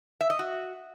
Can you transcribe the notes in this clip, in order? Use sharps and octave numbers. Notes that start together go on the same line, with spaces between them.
E5
D#5
F#4